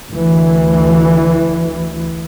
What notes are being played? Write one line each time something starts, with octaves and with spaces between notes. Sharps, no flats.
D2 E3